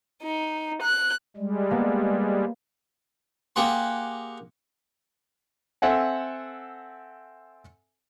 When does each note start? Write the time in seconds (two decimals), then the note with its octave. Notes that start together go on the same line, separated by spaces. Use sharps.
0.23 D#4
0.82 F#6
1.37 G3 G#3
1.71 A#3 B3 A5
3.56 A#3 G4 G#4 F#5 C6
5.82 C4 A4 E5 F#5 G#5